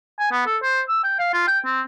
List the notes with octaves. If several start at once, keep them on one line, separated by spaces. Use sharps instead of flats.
G#5
B3
A4
C5
E6
G5
F5
F4
G5
C4